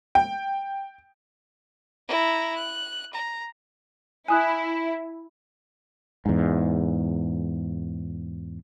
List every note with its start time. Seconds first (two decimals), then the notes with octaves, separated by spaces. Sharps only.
0.15 G5
2.08 E4 A#5
2.56 F#6
3.13 A#5
4.28 E4 G#5 D#6 F#6
6.26 E2 G#2